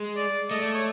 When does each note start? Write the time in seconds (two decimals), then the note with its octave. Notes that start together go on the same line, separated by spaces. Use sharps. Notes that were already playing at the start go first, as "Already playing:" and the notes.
Already playing: G#3
0.17 D5
0.50 A3 D#5
0.62 D5
0.74 C#5